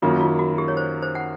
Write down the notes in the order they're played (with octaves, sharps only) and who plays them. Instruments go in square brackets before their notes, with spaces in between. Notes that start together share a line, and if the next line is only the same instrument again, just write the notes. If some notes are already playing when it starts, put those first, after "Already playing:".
[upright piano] F#2 D#3 F#3 A#3 [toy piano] F4
[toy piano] F4
F#4
G4
C#5
C5
C5
F#5